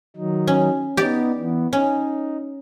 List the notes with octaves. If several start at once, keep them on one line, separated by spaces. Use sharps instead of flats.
D#3 F#3 D#4
C#4
B3 D#4 G4 D5
E3 B3
C#4 D#4